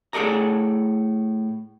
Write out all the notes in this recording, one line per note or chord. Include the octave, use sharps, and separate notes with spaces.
A2 G#4 A4 D5 A#5